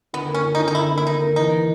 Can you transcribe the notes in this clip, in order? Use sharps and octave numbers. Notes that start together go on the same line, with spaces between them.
D3 B3
A#3
C#4
D3
D#4
D3
D#4
D3 E4
A#3
E4
D3 D#4
A#3
E3 D#4
E3